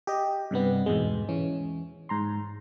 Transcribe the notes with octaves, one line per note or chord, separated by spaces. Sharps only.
G4 D#5
G2 C3 G3 B3
E2 G#2 B2 G#3
E3 C#4
G#2 A#5 C6